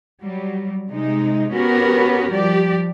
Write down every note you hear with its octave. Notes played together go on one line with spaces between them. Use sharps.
F#3 G3
C3 G#3 D#4
B3 C#4 F#4 G4 A#4 B4
F3 G3 G4 D5